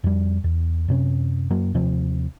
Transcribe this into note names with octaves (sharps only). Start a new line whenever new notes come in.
F2 G3
E2
F#2 C3 C#4
F#2 F#3 A#3
D#2 C3 F3 C4